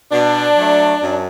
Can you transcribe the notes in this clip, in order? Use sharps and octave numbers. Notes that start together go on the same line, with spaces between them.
B2 D4
F#3 A3
F#2